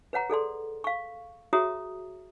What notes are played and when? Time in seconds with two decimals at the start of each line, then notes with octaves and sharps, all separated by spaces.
0.13 B4 C#5 F#5 A#5
0.30 G#4 A4 D5 C6
0.84 F5 C#6
1.53 F#4 G#4 C#5 E5 A#5 D#6